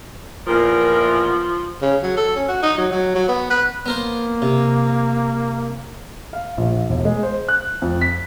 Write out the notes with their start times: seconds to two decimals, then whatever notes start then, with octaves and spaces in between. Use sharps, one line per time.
0.47 E2 A#2 F3 A#4
1.82 C#3
2.03 F#3
2.17 A4
2.36 C#4
2.48 F#4
2.63 D#4
2.78 F#3
2.92 F#3
3.15 F#3
3.29 B3
3.50 B4
3.86 A#3 B3 A#4 C5
4.42 C3
6.33 F5
6.58 A#1
6.89 E1
7.05 G#3
7.23 C5
7.48 F#6
7.82 F2
8.01 B6